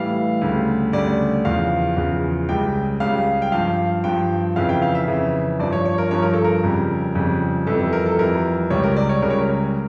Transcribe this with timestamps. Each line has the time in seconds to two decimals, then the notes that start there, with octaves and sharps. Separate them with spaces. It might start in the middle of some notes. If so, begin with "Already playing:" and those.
Already playing: A2 E3 G3 F5
0.42 D2 C#3 G3
0.93 D2 C#3 G3 D5
1.45 E2 C#3 F3 F5
1.97 E2 C#3 F3
2.49 C#2 C#3 G3 G5
3.00 C#2 C#3 G3 F5
3.42 G5
3.52 G2 F3 F5
4.04 G2 F3 G5
4.56 F2 C#3 E3 F5
4.69 G5
4.82 F5
4.95 E5
5.08 F2 C#3 E3
5.59 G2 F3 D5
5.72 C#5
5.85 C#5
5.98 A#4
6.11 G2 F3 C#5
6.22 A#4
6.33 A4
6.44 A#4
6.63 F2 C#3 G3
7.15 F2 C#3 G3
7.67 F2 E3 G3 A4
7.80 A4
7.93 A#4
8.06 A4
8.19 F2 E3 G3 A#4
8.70 C#2 C#3 G3 C#5
8.83 A#4
8.97 D5
9.09 C#5
9.22 C#2 C#3 G3 A#4
9.30 C#5
9.38 A#4